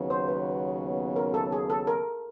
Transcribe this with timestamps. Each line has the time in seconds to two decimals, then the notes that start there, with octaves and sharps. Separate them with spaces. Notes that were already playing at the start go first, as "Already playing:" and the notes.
Already playing: D#2 C#3 F#3 B3
0.10 C5
0.28 B4
1.16 A#4
1.34 A4
1.52 G#4
1.70 A4
1.87 A#4